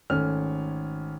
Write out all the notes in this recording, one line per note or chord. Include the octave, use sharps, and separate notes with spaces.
G#1 A3 C#4 F6